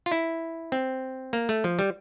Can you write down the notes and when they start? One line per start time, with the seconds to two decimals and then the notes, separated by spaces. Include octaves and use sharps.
0.06 F4
0.12 E4
0.72 C4
1.33 A#3
1.49 A3
1.64 F3
1.79 G3